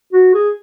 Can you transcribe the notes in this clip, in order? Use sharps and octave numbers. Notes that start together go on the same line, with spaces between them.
F#4
G#4